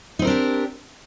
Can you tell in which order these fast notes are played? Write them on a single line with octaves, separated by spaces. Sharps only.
D#4 C4 A#4 D4 G4